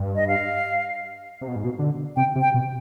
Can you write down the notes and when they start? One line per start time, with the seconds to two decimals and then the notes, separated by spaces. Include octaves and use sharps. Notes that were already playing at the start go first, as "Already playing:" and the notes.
Already playing: G2
0.16 D#5
0.28 F5
1.41 C3
1.48 B2
1.56 G#2
1.64 B2
1.79 D3
2.16 C3 G5
2.36 C3
2.41 G5
2.54 B2